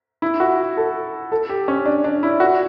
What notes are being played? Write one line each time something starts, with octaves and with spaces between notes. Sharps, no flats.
E4
F#4
A4
A4
G4
C#4
D4
D4
E4
F#4